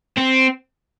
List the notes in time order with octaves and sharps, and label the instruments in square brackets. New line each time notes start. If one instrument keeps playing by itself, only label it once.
[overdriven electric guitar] C4